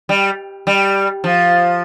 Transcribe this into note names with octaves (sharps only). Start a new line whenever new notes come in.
G3
G3
F3